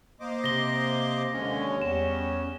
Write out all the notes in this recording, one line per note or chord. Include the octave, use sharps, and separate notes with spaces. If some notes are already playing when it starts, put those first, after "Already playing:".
A#3 C5 D#5 D6
C3 A#6 G7
D#2 D3 G#3 C#4
E2 G3 E7